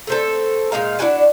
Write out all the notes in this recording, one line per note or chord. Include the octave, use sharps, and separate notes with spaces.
A3 C4 A4
A#2 G#3 D#4 F5
D4 E4 F#4 G#5